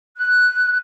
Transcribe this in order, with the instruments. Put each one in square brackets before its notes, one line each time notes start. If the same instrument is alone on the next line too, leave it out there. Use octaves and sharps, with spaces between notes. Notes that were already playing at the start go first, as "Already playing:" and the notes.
[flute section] F#6